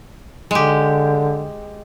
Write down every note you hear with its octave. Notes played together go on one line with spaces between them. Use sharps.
D3 G#3 G4